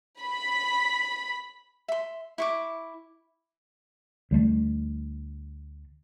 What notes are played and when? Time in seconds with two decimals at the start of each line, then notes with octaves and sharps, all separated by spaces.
0.21 B5
1.88 E5 C6
2.38 E4 C#6 D6
4.31 D2 G3 A3